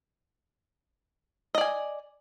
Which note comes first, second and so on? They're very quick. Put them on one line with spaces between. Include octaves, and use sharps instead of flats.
D#5 D5 G#5